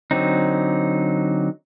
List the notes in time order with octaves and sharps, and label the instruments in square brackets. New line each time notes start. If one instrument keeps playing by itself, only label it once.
[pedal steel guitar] D3 F#3 C4 D#4